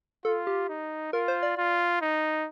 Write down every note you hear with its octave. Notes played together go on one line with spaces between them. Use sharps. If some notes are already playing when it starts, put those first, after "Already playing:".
F4 A4
G4
D#4
F4 A#4
C5
D5
F4
D#4